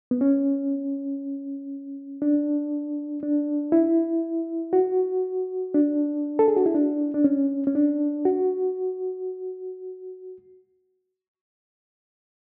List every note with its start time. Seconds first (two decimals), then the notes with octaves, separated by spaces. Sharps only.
0.11 B3
0.21 C#4
2.22 D4
3.23 D4
3.72 E4
4.73 F#4
5.74 D4
6.39 A4
6.48 G#4
6.56 F#4
6.66 E4
6.74 D4
7.14 D4
7.24 C#4
7.67 C#4
7.75 D4
8.25 F#4